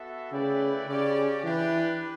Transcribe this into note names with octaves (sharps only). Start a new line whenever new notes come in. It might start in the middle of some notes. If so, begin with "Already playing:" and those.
Already playing: B3 F#4 A4 E5
C#3 A3 E4 B4 D5 G5
C#3 C#4 G4 D5
E3 D4 G4 B4